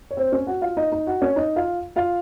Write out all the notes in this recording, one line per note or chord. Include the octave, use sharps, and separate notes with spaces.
C#5
C4 C5
C#4 C#5
F#4 F#5
F4 F5
D#4 D#5
D#4 D#5
F#4 F#5
C#4 C#5
D#4 D#5
F4 F5
F4 F5